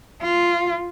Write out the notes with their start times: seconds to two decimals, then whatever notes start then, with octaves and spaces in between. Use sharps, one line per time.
0.21 F4